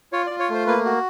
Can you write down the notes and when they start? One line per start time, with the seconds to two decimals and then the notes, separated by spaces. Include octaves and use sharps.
0.12 F4 C#5
0.26 F4 D5
0.40 C#5
0.49 A3 C5
0.67 A#3 B4
0.85 F#4